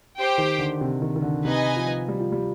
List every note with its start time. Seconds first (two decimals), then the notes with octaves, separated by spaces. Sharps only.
0.17 G4 C5 G5
0.38 D#3
0.58 D3
0.81 C3
1.02 D#3
1.16 D#3
1.22 D3
1.44 C3 D#4 B4 D#5 G#5
1.76 F3
2.08 G3
2.20 F3
2.32 G3